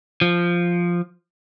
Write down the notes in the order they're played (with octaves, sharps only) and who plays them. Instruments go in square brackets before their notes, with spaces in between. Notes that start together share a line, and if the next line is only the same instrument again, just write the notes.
[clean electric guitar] F3